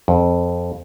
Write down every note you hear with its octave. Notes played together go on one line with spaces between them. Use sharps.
F2